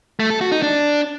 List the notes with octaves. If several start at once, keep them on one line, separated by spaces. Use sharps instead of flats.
A3
A4
F#4
D#4
D4